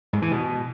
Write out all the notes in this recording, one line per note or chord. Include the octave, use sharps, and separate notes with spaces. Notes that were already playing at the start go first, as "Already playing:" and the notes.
G#2
E3
B2